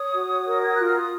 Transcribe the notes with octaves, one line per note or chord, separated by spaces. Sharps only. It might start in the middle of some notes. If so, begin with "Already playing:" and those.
Already playing: C#5 D#6
F#4
A#4
G#6
F4 F#6
F6
D#6